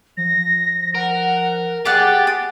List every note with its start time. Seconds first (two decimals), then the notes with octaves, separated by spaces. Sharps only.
0.17 F3 A#6
0.95 A#4 F#5
1.85 G4 G#4 D5 F#5 A6
2.27 D#6